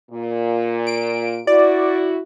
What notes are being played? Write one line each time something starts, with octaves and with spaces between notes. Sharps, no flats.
A#2
D7
E4 F#4 D5